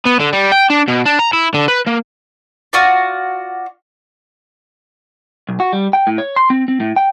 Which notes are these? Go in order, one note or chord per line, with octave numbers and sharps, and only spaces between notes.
B3
D3
G3
G5
D4
B2
D4
A#5
E4
D3
B4
A#3
F4 F#4 D5
B1
F#4
G3
G5
A2
C#5
C6
C4
C4
A2
G5